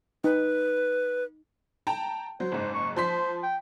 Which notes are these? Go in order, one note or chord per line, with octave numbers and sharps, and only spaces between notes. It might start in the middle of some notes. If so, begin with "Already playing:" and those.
D#4 B4
G5 A5 A#5
F#3 C5
F#1 G#2
C#6
F3 C5 C6 B6
G5